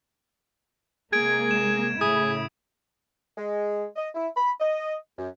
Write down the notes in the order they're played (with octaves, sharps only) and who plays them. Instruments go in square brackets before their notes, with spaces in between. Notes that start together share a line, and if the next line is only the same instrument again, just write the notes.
[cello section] C3 G#3 A#3 [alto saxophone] G#4 [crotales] G#6 D7
[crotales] E7
[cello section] A2 C#3 E4 [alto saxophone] G#4 [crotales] D#6
[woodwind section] G#3
D#5
E4
B5
D#5
F#2